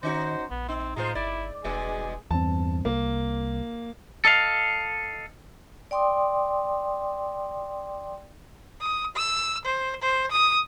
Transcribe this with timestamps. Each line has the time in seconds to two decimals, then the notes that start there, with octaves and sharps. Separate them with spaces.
0.03 D#3 C#4 D#4 F#4 C5
0.50 A#1 B3
0.69 C4 D#4
0.96 A2 G#3 D#4 F4 C5
1.15 G1 E4 D5
1.64 E1 G2 B2 G#3 G#4
2.31 E2 G2 C4 A5
2.85 C2 A#3
4.25 A4 D#5 F5
5.91 D5 G5 C6 D6 D#6
8.81 D#6
9.16 E6
9.65 C5
10.02 C5
10.31 D#6